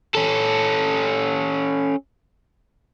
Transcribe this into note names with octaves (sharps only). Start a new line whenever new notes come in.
C#4 A4